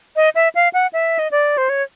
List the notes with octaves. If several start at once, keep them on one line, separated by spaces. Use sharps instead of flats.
D#5
E5
F5
F#5
E5
D#5
D5
C5
C#5